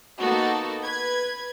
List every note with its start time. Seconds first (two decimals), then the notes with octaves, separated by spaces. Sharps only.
0.19 A#3 B3 D#4 F#4 A4
0.82 B4 G#6